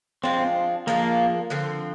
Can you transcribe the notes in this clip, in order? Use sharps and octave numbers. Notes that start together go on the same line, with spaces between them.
F3 G#3 C4 D4 F4
F3 G#3 A#3 D4 F4
D3 F3 C4